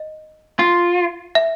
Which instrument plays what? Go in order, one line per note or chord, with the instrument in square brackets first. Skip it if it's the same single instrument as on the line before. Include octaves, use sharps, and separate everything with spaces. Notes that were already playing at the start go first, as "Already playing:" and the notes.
Already playing: [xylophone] D#5
[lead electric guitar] F4
[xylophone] E5